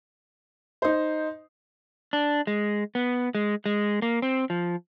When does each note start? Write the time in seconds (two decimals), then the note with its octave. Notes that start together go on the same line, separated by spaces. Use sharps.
0.82 D#4 C5
2.13 D4
2.47 G#3
2.95 B3
3.35 G#3
3.66 G#3
4.02 A#3
4.22 C4
4.50 F3